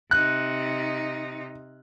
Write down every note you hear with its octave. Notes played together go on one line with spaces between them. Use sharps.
C3 D#4 F#6